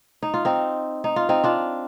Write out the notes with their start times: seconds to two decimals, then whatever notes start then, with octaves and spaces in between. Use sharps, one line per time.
0.23 D#4
0.34 F4
0.45 C4 D#4
1.04 D#4
1.16 F4
1.29 C4 D#4
1.44 D4 F4